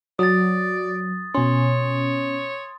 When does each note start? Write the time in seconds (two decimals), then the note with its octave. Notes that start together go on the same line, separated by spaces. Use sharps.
0.19 F#3 D5 D#6 A6
1.34 B2 C#4 C#5 C6